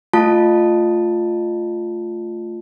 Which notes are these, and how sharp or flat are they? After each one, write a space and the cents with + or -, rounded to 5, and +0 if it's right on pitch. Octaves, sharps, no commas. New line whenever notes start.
A3 +0 F4 +0 A5 +0